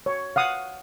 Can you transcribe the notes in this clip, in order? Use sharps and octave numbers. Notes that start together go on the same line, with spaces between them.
C#5
F5 F#5 D#6